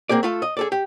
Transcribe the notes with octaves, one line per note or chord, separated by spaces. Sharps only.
A#3 C4 G#4 D5
A3 F4 A4
D#5
G#4 A4 D5
G4